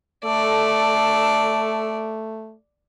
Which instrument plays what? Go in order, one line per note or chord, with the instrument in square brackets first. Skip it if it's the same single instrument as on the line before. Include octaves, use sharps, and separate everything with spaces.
[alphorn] A3 [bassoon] A4 [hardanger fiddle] D5